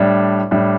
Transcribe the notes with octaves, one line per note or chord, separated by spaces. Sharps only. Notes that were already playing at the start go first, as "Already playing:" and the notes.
Already playing: A2 G3 D4
A2 G3 D4